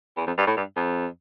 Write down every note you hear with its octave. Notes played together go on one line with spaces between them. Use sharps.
E2
F2
G2
A2
G2
F2